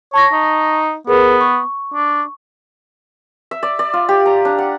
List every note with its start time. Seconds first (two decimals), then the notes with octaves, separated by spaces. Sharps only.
0.14 C#5 A5 C#6 A#6
0.33 D#4
1.07 B3 G#4 A#4 B4
1.41 C#6
1.94 D4
3.51 E5
3.63 D5
3.79 D5
3.93 F4
4.09 G4
4.26 A#5
4.45 D4
4.58 F#5